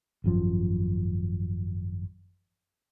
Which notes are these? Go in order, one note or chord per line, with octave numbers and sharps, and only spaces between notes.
G#1 F#2 F3